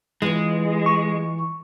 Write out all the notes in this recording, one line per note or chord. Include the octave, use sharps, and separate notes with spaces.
E3 G#3 F4
C#6